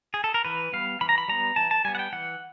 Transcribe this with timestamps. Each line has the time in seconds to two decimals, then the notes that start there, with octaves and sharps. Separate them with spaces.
0.14 G#4
0.24 A4
0.34 A#4
0.45 E3 B4
0.72 G3 B3 F5
1.01 E3 B5
1.09 A#5
1.18 B5
1.28 G3 B3 A#5
1.56 E3 A5
1.71 A5
1.85 G3 B3 G#5
1.95 F#5
1.99 G5
2.13 E3 F#5